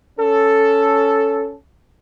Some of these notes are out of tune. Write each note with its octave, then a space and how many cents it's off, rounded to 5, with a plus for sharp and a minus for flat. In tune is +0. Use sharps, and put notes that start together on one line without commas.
C#4 +10 A4 +0